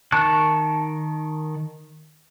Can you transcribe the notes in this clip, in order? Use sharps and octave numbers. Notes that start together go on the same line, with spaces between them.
D#3 A5 C#6 F#6